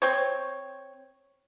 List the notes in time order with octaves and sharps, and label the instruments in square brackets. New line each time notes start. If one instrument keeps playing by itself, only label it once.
[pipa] C4 C#5